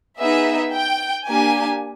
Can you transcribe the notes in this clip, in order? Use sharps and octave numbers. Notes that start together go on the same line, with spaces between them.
B3 D#4 G#4 E5
G5
A#3 D4 G4 G#5